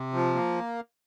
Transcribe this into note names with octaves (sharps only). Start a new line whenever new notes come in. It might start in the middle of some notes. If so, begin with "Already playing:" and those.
Already playing: C3
F3
A#3